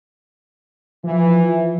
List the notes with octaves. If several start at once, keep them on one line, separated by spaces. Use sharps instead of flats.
E3 F3